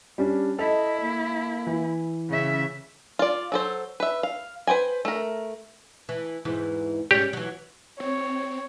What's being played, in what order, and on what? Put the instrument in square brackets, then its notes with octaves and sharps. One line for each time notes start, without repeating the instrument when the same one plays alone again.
[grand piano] G3 C#4 D4
[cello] E4 [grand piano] A4 [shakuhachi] D#5
[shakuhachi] A#3
[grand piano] E3
[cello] C#3 E5 [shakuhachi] C#4
[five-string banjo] F4 D5
F#3 A4 C5
B4 E5
F5
B4 C5 G5 G#5
A3 A#4
[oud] E3
E2 G#2 E3
[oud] G#2 G3 C#4 [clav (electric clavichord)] G4
[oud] E3 F#3
[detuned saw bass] C4 [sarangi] C#5